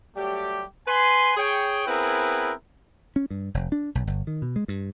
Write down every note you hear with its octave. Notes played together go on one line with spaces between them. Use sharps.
F#3 G3 A3 G4
B4 G#5 C6
G#4 C#5 G5
B3 C4 E4 G#4 A#4 B4
C#4
G2
F1
D4
B1
G1
D#3
B2
G#3
G2